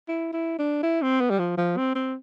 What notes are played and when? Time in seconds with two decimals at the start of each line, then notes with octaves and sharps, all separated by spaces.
0.09 E4
0.33 E4
0.59 D4
0.83 E4
1.02 C4
1.21 B3
1.30 G3
1.39 F3
1.57 F3
1.77 C4
1.95 C4